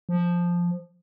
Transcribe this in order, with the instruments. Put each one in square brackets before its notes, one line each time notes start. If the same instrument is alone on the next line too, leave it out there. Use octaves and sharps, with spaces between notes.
[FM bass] F3